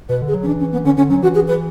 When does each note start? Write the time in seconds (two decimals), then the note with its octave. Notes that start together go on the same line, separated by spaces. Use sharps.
0.09 B2 B4
0.22 D3
0.28 G#4
0.34 F#3
0.43 C#4
0.47 E3 D4
0.60 C#4
0.72 B3
0.85 D3 C#4
0.97 D3 C#4
1.10 F#3 C#4
1.22 E3 F#4
1.35 G#4
1.48 B4